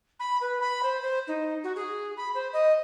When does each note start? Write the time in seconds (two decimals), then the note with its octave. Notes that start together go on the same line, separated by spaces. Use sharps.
0.19 B5
0.41 B4
0.60 B5
0.83 C5
1.02 C5
1.27 D#4
1.64 F#4
1.76 G#4
2.17 B5
2.35 C5
2.53 D#5